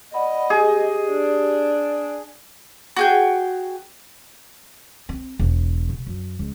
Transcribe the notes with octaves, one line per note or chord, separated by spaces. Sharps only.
D5 D#5 F#5 B5
G4 G#4
D4
F#4 G#4 G5
C4
E1
C3
F#2
C#2